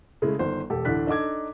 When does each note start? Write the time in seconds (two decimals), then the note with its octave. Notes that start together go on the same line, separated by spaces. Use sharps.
0.22 C#3 G#3 A3 E4
0.39 G1 D#3 C5
0.70 E1 G4 A4
0.85 D2 A2 E3 D4 F#6 B6
1.07 D4 D#4 A4 D6 G#6